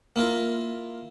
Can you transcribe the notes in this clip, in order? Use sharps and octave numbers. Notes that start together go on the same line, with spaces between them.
A#3 E4 F4 A#4